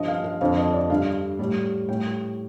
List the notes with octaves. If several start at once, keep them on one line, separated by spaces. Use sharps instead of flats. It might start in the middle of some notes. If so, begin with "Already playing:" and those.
Already playing: G2 F3 D#5
F5
F5
F2 D3 F3 F5
D#5
D5
G2 D3 G3 F5
A2 G3
A2 G3 G5